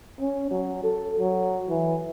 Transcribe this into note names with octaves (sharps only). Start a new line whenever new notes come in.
C#4
F#3
A4
F#3
E3